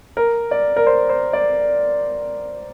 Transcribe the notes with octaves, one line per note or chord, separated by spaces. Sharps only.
A#4
D5
A#4
C5
C5
D5